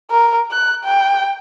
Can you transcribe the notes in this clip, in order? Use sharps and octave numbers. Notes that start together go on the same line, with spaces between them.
A#4
F#6
G5